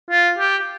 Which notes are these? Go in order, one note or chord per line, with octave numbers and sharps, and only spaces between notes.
F4
G4